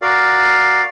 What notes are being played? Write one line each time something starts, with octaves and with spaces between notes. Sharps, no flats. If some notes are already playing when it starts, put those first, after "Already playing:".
F#4 A#4 D5 F5